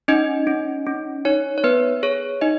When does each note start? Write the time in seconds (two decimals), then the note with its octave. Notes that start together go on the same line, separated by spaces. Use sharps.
0.08 C#4 D#4 D#5
0.47 C#4
0.86 C#4
1.25 D#4 C#5
1.58 C#5
1.64 B3 B4
2.03 G#4 C#5
2.41 D#4 D#5